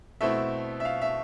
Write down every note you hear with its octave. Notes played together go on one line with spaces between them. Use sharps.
B2 A3 C4 E4 E5
E5
F5
E5